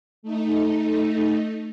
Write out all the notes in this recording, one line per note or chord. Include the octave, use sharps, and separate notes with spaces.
A3 D#4